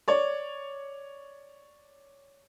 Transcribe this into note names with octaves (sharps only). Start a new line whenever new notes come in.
C#5 D5